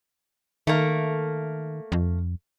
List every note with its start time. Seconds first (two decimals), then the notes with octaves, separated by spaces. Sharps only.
0.67 D#3 A3 A#3
1.92 F2